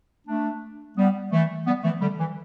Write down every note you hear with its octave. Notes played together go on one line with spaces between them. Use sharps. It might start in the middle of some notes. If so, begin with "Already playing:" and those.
A3 D4
G3 B3
E3 A3
G3 B3
E3 A3
D3 G3
E3